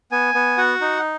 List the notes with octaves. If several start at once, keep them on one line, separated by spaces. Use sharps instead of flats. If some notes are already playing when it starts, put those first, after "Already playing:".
B3 G#5
B3
F#4 F#5
D#4